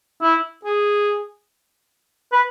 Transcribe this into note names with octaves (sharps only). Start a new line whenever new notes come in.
E4
G#4
B4